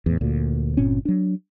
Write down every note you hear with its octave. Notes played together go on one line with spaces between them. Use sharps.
E2 A2
D2 A#2
G1 A#2 C4 C#4
F#3 D4